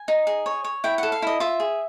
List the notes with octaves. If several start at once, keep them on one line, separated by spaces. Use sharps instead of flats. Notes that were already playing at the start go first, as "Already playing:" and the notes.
Already playing: G#5
D#4
G#4
C#5
C#5
E4 G5
A4 F#5
F5
E4 D#5
F4 E5
G#4